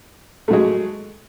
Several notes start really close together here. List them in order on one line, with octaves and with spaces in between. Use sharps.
A3 F#3 G#3